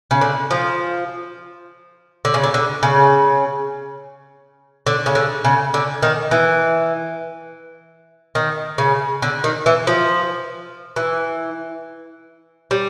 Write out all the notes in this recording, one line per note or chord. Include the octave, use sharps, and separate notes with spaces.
C#3
D3
F3
D3
C#3
D3
D3
C#3
D3
C#3
D3
C#3
D3
D#3
E3
D#3
C#3
D3
D#3
E3
F3
E3
G3